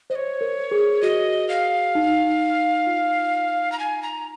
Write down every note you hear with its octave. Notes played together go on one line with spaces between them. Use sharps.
C5 D#5
C#5
A#4
G#4
F#4 D#5
F5
D#4
F4
A#5
G#5
A#5